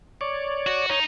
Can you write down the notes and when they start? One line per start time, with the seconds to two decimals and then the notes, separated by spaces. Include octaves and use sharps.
0.21 C#5 D5
0.67 F#4
0.90 D#4 C#5